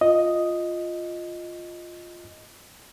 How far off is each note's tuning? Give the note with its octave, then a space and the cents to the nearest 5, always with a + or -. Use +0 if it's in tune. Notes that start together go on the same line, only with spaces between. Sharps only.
F4 +0 D#5 +0